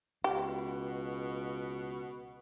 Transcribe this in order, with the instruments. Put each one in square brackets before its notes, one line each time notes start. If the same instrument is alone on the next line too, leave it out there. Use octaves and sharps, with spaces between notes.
[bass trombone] C#2 [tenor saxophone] B2 [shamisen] G4